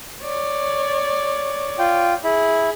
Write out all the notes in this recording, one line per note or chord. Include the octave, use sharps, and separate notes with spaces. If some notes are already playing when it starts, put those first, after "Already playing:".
C#5 D5
F4 G5
E4 G#4